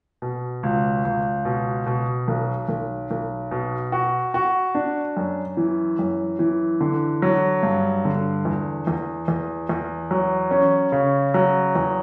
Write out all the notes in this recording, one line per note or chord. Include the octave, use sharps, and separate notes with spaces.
B2
C#2
C#2
B2
B2
B1
B1
B1
B2
F#4
F#4
D4
F#2
E3
F#2
E3
D3
F#3
G2
D3
E2
E2
E2
E2
F#3
C#4
C#3
F#3
E2